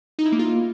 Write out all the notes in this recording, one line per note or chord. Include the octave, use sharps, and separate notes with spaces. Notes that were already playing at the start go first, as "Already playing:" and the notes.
D#4
E4
A#3
F4